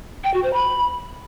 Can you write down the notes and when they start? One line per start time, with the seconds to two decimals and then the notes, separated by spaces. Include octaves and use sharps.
0.24 G5
0.34 F#4
0.44 C5
0.53 B5